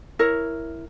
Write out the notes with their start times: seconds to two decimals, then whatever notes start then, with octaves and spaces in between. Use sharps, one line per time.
0.19 E4 A#4 C#5